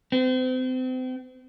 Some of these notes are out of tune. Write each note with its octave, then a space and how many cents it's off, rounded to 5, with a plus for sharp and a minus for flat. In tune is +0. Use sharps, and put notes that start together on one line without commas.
C4 -35